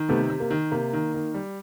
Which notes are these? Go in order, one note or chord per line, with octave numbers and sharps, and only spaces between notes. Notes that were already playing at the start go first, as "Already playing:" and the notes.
Already playing: D#3
C3 A3 B3
C3
A#3
D#3
C3 A#3
D#3
D#3
G3